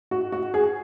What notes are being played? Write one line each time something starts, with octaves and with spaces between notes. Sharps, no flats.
F#4
F#4
G#4